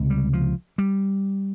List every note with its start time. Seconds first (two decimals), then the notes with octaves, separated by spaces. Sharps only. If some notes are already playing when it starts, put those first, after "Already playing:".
Already playing: C#2 C3
0.10 G3
0.33 F3
0.78 G3